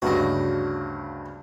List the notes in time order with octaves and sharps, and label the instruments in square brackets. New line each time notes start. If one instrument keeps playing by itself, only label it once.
[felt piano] D2 G2 C#3 [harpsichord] F#4 D#5